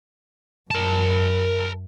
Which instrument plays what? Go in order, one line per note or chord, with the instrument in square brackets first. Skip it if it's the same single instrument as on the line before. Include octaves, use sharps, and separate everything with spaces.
[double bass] F#2 [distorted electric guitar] A#4 A5